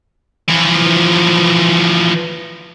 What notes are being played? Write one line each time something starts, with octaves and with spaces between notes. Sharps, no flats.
E3 F3